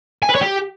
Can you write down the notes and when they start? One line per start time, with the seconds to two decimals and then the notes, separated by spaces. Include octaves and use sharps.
0.23 G#5
0.29 B4
0.35 C#5
0.41 G4